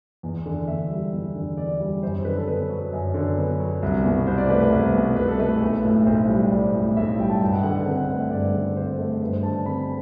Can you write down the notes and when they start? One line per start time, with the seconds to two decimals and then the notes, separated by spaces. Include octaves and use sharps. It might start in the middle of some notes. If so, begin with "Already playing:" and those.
0.23 E2
0.46 D3
0.68 E2 E5
0.90 G3
1.13 E2
1.35 D3
1.58 E2 D5
1.80 G3
2.03 F#2 C5
2.25 D3 B4
2.37 A4
2.47 B3 B4
2.70 F#3
2.93 F#2
3.14 D3
3.38 B3
3.60 F#3
3.83 C2
4.05 B2
4.27 C2 C5
4.38 D5
4.49 A3 B4
4.60 B4
4.72 C2
4.95 B2
5.16 C2 B4
5.28 A4
5.39 A3 B4
5.62 B1
5.84 A2
6.06 B1 C5
6.29 G3
6.51 B1 D5
6.74 A2
6.96 B1 E5
7.19 G3 G5
7.29 A5
7.41 G2 G5
7.52 F#5
7.63 D3 F#5
7.75 B4
7.86 C4 B4
7.97 F#5
8.08 A3
8.20 E5
8.30 G2 D5
8.54 D3
8.76 C4 C5
8.99 A3
9.21 G2 B4
9.32 C5
9.43 D3 A5
9.55 A5
9.66 C4 B5